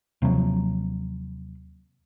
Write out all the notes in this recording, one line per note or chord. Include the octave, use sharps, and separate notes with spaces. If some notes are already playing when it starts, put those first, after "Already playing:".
D#2 C3 F3 F#3